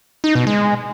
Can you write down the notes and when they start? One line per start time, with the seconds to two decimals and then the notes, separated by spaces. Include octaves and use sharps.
0.24 D#4
0.35 B2
0.47 G#3